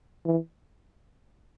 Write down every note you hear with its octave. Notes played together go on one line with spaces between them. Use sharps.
E3